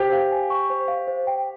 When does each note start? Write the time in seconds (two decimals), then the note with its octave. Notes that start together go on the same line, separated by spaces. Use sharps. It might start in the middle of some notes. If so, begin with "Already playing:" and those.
Already playing: G4 C5
0.13 F5
0.32 G#5
0.50 C#6
0.70 C5
0.88 F5
1.08 C5
1.27 G5